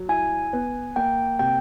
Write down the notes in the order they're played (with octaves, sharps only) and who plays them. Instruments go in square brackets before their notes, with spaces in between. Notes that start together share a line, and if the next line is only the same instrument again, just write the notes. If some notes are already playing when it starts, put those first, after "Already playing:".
Already playing: [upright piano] F#3
[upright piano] E4 [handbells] G#5
[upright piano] B3
[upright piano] A#3 [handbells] G5
[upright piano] C3 [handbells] G5